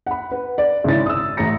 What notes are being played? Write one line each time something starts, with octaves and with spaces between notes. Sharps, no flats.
F#5 B5
B4
D5
G#1 C#3 E4 C#5 A6
D#6 E6
A1 A3 A#5 A#6 C#7